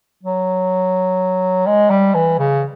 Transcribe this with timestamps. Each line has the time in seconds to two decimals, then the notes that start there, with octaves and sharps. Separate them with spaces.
0.23 F#3
1.67 G#3
1.90 G3
2.14 E3
2.39 C#3